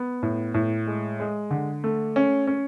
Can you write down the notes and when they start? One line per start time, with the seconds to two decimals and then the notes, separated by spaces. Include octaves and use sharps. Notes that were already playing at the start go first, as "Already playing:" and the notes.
Already playing: B3
0.23 A2
0.54 A2
0.87 G#3
1.20 G#3
1.51 D3
1.84 A3
2.16 C#4
2.47 C#4